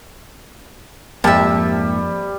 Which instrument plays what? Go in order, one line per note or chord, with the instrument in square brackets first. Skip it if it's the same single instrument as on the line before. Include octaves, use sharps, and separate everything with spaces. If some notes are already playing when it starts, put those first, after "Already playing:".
[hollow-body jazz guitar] F2 [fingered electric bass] G#2 A#3 [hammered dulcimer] G3 [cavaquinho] E5 A5